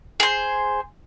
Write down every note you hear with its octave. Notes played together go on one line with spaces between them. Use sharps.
G#4 C5